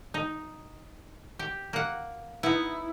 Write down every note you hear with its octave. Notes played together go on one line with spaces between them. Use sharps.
D#4
G4
A#3 F#5
B3 D#4 E4